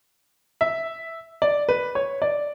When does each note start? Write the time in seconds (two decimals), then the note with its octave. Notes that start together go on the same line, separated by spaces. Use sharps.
0.61 E5
1.42 D5
1.69 B4
1.95 C#5
2.22 D5